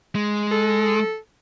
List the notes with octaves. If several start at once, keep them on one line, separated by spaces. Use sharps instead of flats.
G#3
A4